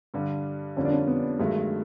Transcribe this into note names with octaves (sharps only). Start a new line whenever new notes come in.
G2 D3 G3
F2 D3 G3 A#3 C#4
D4
C#4
B3
G2 D#3 F#3 G#3 A3